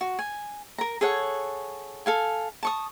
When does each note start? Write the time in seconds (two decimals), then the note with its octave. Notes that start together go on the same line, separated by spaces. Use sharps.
0.01 F#4
0.19 G#5
0.78 A#4 A#5
1.01 G#4 A4 C#5 F#5
2.06 A4 F5 G#5
2.63 A5 C#6 D#6